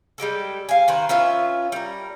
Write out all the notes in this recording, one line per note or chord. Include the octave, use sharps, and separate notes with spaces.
G3 G#3 G4 A4
F5 G#5
D#3 B4 C5
C#4 F4 B4 E5
G3 A#4